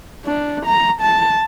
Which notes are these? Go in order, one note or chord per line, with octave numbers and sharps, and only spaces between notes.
D4
A#5
A5